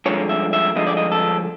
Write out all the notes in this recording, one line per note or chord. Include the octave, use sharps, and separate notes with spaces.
G2 D3 F3 G#3 C#5
E5
E5
G2 D3 F3 G#3 D#5
D5
D#5
A4